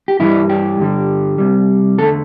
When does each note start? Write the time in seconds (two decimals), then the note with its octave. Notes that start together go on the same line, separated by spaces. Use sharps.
0.08 G4
0.19 G2 E3 G3 E4
0.49 G4
0.79 G2 D3 G3
1.38 C2 C3 G3
1.98 E2 D3 A3 A4